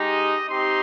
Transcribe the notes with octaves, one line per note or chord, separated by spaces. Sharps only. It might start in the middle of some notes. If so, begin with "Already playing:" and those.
Already playing: G#3 D#4 G4 D#5
C4 D#4 G4 C6